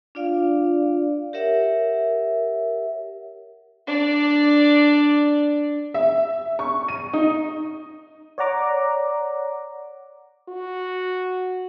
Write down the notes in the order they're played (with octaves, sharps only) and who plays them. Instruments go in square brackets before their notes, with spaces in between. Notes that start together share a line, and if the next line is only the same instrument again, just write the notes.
[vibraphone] D4 F4 D5 F5
G4 A#4 C#5 E5 F#5
[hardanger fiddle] D4 D5
[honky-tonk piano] E5
C#6
D#7
D#4
[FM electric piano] C#5 D5 F#5 A#5 D6
[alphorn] F#4